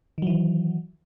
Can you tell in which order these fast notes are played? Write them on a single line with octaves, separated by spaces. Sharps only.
D#3 F#3 E3